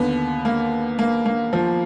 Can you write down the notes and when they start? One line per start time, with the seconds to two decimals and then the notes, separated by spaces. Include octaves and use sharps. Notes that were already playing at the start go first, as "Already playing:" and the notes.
Already playing: D#2 D3 B3
0.45 A#3
0.99 A#3
1.26 A#3
1.53 F3